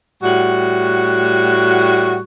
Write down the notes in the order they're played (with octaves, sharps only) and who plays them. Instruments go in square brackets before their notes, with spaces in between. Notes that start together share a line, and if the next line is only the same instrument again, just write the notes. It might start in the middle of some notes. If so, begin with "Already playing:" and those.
[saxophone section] A2 G3 F#4